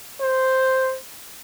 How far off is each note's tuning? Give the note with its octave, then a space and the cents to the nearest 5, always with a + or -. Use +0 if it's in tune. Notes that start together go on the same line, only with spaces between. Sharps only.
C5 +0